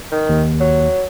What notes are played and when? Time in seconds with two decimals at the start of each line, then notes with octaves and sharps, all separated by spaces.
0.12 D#3
0.29 D#2
0.60 F#3